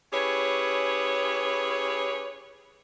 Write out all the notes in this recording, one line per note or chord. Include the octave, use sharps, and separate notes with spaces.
C#4 E4 G4 G#4 B4 C#5